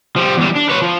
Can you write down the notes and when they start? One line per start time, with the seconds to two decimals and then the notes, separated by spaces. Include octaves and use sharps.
0.16 F3 G3
0.37 E2 G3
0.56 D4
0.70 B4 C#5
0.82 F3